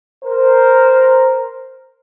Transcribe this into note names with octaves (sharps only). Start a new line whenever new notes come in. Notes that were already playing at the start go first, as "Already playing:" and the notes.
A#4 C5